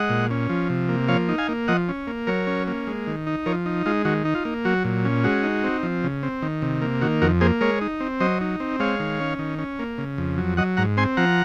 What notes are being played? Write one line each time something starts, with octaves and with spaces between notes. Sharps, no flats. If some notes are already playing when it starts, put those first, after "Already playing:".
Already playing: G#3 D#5 F#5
A#2
C#4
F3
C3
A#3
F3 C#5 F5
D#4
F5 G#5
A#3
F3 D#5 F#5
C#4
A#3
F#3 A#4 C#5
C#4
A#3
G#3
D#3
D#4
F3 A#4 C#5
D#4
G#3 F4
D#3 F#4
D#4
F4
A#3
F#3 F#4
A#2
C#4
G#3 F#4
D#4
C4
F3
C#3
C4
D#3
C3
A#3
D#3 F#4
F2 F#4 A#4
A#3 G#4 C5
G#3 A#4 C#5
D#4
C4
F#3 C5 D#5
D#4
C4
G#3 C#5 F5
D#3
C#4
D#3
C#4
A#3
C#3
F2
F#3
F#3 D#5 F#5
G#2 F#5 A#5
C4 G#5 C6
F3 F#5 A#5